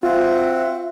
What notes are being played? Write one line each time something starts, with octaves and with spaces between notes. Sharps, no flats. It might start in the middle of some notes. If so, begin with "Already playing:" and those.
C4 F4 F#4 E5